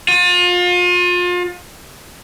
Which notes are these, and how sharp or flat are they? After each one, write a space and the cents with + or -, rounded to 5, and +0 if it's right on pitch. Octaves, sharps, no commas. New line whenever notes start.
F4 +35